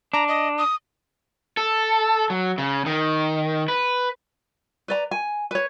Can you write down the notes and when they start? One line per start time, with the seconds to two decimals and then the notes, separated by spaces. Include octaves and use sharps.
0.14 D4 A#5
0.28 D#5
0.58 D#6
1.57 A4
2.30 F#3
2.58 C#3
2.86 D#3
3.68 B4
4.88 B4 D5 A#5
5.11 G#5
5.51 B4 C#5